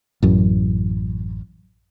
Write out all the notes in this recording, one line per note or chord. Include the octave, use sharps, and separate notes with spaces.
A1 F#2